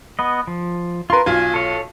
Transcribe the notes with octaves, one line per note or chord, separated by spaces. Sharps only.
B3 D#5
F3
F4 A#4 B4 C6
B1 F4 G#5
A4 C#5